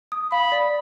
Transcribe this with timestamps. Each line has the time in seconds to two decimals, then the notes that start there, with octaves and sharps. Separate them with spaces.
0.12 D#6
0.32 F5 B5
0.52 D5